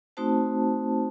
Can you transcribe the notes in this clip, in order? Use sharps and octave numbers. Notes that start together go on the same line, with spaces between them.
A3 C4 D#4 F#4 C5 A5